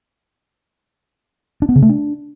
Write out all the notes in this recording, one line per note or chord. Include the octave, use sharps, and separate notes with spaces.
D4
B3
C#3
A3
D4